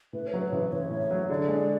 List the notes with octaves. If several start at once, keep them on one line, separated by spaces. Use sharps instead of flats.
A2 B4
C#5
F#3
B4
A1
A1 C#5
A2
F#3
D3 D5
G#3